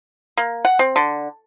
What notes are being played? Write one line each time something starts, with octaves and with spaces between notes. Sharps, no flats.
A#3
F#5
C4
D3